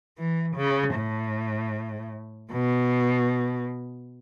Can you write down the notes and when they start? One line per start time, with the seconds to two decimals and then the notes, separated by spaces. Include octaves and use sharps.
0.18 E3
0.56 C#3
0.96 A2
2.52 B2